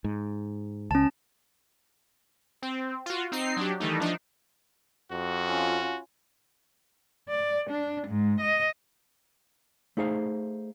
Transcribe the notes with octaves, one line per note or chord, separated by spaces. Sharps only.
G#2
C#2 C#4 A5
C4
F4 F#4
C4 D#4 C7
F#3 D4 G4
D#3 E3 G3 A3 D#4
F3 D4 D#4
F2 F#4
C#4 F4
D5
D4
G#2
D#5
A3 D#4 G#4 C5 F5